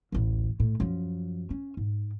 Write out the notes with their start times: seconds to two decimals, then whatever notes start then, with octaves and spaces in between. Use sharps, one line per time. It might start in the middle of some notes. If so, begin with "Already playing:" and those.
0.12 A1 D2
0.60 A2
0.80 F#2 F3
1.50 C#4
1.77 G#2